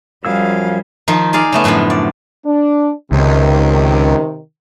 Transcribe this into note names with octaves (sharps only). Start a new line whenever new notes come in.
F#2 F3 G3 G#4 F5 E6
D#3 F3 D#4
D#4 G#4 D5 F5
C#3 A3 B3
F#2 A2 D3 F3 B3
D5
D4
C#2 C3 D#3